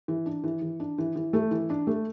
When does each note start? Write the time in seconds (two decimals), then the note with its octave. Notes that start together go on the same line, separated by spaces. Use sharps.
0.08 E3
0.26 D4
0.44 E3
0.62 E3
0.80 D4
0.98 E3
1.16 E3
1.33 A3
1.51 E3
1.70 D4
1.87 A3